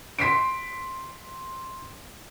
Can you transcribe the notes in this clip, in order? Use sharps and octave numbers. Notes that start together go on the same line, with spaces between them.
C6 B6 C7 D7